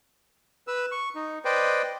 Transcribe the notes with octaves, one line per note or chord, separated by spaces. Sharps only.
B4 E6
C#6
D#4
B4 C5 D5 D#5 G5